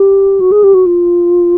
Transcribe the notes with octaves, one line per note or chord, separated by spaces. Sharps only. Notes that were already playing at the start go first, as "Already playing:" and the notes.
Already playing: G4
F#4
G#4
G4
F#4
F4